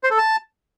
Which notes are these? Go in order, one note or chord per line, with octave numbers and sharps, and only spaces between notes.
C5
A4
A5